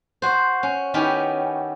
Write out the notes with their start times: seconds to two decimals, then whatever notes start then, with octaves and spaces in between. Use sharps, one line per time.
0.22 F#4 C5
0.63 C#4
0.94 D#3 B3 C#4 E4 G4